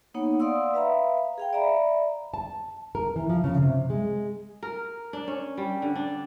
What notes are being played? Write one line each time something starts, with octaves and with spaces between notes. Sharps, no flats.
A#3 B3 D#4 C#5 F#5
D5 F5 F#5 C6 D#6 E6
B4 E5 F5 A#5 B5
G#4 F5 G5
D5 E5 A#5 B5
A5
A#4
E3
F3
C#3
C3
G#3
A#4
D4
C#4
G3
D3
D4